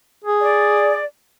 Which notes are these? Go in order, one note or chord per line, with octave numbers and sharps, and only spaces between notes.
G#4
D5